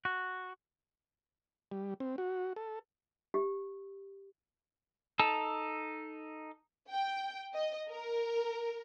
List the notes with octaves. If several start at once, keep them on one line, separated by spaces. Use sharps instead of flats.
F#4
G3
C4
F#4
A4
G4
D#4 A4 A5 E6
G5
D#5
A#4